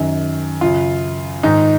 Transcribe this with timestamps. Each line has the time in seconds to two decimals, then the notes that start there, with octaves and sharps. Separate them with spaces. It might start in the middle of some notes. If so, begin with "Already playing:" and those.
Already playing: F#2 D#3
0.61 F#2 C#3 F4
1.43 G#2 D#3 D#4